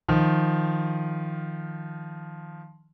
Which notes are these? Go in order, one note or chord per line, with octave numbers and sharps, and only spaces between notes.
D#3 F3